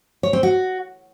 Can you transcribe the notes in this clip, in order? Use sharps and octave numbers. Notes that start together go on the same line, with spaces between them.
C#5
C4
F#4